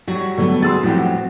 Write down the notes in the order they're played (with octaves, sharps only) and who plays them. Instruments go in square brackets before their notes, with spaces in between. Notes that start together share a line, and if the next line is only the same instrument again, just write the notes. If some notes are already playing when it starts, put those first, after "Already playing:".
[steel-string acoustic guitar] F#3 [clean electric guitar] G3 F#4
[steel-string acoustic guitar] D3 F#3 B3 [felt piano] A3
[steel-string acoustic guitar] G#4 [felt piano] C6 E6 A6
[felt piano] A2 F#5 [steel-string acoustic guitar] F3 [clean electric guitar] F#3 C4 G4